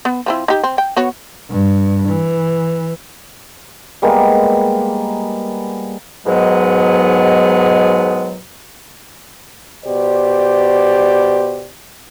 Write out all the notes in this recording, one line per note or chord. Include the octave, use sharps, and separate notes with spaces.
B3
F3 C4 E4
D#4 G4
C4
G5
B3 F#4 C#5
G2
E3
G3 G#3 A#3 B3
G#2 B2 D#3 F#3 G#3 B3
B2 G4 C5 D5